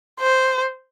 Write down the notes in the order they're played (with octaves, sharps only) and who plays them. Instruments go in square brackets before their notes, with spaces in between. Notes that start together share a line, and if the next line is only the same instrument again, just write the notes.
[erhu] C5